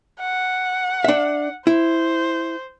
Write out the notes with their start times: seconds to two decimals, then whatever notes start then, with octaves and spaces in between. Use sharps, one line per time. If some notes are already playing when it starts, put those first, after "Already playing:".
0.20 F#5
1.04 D4 E5
1.67 E4 C5